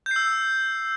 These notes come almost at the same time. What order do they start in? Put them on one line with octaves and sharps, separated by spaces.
G6 C7 E6